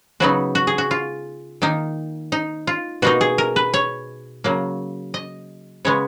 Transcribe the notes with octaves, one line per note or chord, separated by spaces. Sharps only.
C#3 F#3 B3 D#4 F#4
F#4
G#4
F#4
F4
D#3 A#3 D#4
D#4
F4
B2 A#3 D#4 F#4
G#4
A#4
B4
C#5
C#3 F#3 A#3
D#5
C#3 G#3 B3 C#5